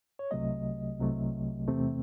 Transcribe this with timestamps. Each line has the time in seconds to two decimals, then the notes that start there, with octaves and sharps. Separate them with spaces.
0.19 C#5
0.31 C2 C3 F#3 A3 D#5
1.00 C2 C3 F#3 A3
1.68 E2 C3 E3 A3 C4